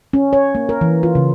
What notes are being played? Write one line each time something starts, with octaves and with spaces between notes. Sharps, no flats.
C#4
C#5
A#3
A#4
E3
F4
C#3